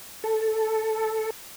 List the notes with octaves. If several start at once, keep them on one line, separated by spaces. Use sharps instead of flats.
A4